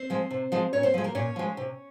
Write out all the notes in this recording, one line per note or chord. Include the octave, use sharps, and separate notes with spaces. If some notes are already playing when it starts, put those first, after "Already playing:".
Already playing: C4 C5
F3 G#3
C3
F3 G#3
A#2 C#4 C#5
C4 C5
F3 G#3
A#3 A#4
A#2 C#4 C#5
F3 G#3
C3